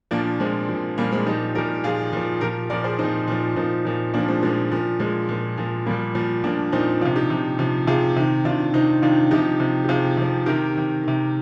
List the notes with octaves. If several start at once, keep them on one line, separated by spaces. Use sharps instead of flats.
A#2 F3 A#3 D4
A#2 F3 G#3 C4
A#2 F3
A#2 F3 G3 A#3
G#3 C4
A#2 F3 D#4 G4
A#2 F3 G4 A#4
A#2 F3 F4 G#4
A#2 F3
A#2 F3 G4 A#4
A#2 F3 A#4 D5
G#4 C5
A#2 F3 C4 D#4
A#2 F3
A#2 F3 C4 D#4
A#2 F3
A#2 F3 A#3 D4
G#3 C4
A#2 F3 G#3
A#2 F3
A#2 F3 G#3
A#2 F3
A#2 F3
A#2 F3 G3 A#3
A#2 F3
A#2 F3 A#3 D4
A#2 F3 C4 D#4
C3 F3 D4 F4
D#4 G4
C3 F3
C3 F3
C3 F3 F4 G#4
C3 D#3
C3 D#3 D4 F4
C3 D#3 C4 D#4
C3 D#3 D4 F4
C3 F3 D#4 G4
C3 F3
G4
C3 F3 F4 G#4
C3 F3
C3 D#3 G4 A#4
C3 D#3
C3 D#3